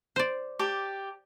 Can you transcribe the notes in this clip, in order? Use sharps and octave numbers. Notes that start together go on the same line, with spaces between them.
C5 D5
G4 A5 D6